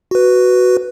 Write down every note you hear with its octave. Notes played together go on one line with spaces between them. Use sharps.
F#4 B4